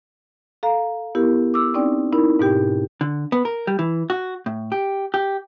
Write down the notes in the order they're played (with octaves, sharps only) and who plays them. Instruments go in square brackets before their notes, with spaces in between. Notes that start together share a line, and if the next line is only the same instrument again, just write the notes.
[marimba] A4 F5 A#5
B3 E4 G4 A#4
D6 E6
C4 C#4 D#4 D5 G5
D#4 E4 A#4 B5
G#2 B2 G4 G5
[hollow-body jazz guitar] D3
B3
A#4
G3
E3
F#4
A2
G4
G4